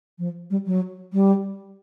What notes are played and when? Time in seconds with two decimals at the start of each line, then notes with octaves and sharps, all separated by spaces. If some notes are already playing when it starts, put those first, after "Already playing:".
0.19 F3
0.50 G3
0.66 F#3
1.13 G3